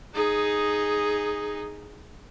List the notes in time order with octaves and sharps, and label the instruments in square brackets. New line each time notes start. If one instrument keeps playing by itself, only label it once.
[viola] D#4 G#4